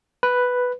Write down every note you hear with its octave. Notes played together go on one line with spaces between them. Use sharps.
B4